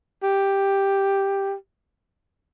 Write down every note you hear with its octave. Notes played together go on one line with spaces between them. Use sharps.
G4